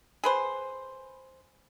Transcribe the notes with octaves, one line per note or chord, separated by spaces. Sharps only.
G#4 B4 C5